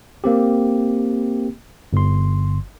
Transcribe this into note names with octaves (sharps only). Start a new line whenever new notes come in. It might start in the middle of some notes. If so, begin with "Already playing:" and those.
A#3 C4 G4
G1 C6